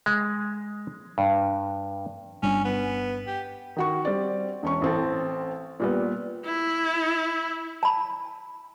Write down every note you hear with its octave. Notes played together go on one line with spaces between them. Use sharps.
G#3
G2
G1 G3 C#4 D4
B3
G4
D#3 F#4 C#6
G3 C4 D5
E1 C#4 C#6
A1 C4 A4
A#2 G3 B3
E4
A5 B5